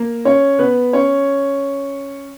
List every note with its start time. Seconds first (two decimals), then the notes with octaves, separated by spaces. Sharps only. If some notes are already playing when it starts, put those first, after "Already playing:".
Already playing: A#3 A#4
0.25 C#4 C#5
0.59 B3 B4
0.93 C#4 C#5